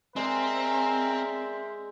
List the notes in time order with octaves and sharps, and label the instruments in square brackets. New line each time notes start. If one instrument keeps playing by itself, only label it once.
[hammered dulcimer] G#3 G#4 [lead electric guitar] C4 [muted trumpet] A#4 [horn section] C5 D5 E5